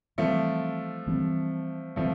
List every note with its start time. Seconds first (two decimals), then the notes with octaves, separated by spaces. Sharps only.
0.18 E3 F3 G3 A3 C4
1.07 E3 G3 C4
1.96 E3 F3 G3 A3 C4